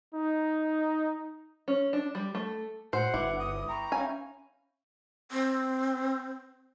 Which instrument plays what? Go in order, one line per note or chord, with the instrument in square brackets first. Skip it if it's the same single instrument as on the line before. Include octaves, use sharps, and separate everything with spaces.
[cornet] D#4
[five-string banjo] C#4
D4
G3
A3
[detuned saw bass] A2 [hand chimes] F#4 [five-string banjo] C5 [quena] F#5
[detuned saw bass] G1 [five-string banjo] E4 [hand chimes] B4 E5 D6
[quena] D#6
[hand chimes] G5 B5 C#6 [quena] A#5
[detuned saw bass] C#4 [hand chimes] E5 F5 G5 [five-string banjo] G#5
[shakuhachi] C4